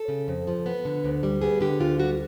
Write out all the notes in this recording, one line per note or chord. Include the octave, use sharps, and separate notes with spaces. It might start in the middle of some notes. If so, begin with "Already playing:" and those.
Already playing: A4
C#3
F2
F3
B3
D3
D2
G3
B3 G#4
D3 G4
D2 F4
G3 F#4